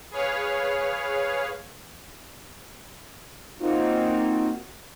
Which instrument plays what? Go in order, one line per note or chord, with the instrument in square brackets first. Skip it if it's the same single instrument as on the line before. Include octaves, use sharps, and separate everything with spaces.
[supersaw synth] G#4 B4 C#5 F5
[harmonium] A#3 C4 D#4 F4 F#4